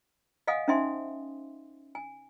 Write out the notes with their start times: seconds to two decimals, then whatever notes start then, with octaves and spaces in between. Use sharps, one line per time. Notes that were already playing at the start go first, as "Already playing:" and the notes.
0.47 D#5 F5 F#5 G#5 D#6
0.68 C#4 D#4 C5 E5 G#5 C6
1.95 G#5